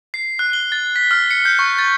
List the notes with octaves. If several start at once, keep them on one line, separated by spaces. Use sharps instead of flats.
C7
F#6
G7
A6
B6
F6
C#7
G6
C#6
A6